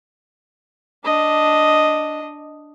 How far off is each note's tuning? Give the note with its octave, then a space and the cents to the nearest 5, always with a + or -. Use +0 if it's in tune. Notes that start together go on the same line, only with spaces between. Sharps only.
D4 +0 D#5 +0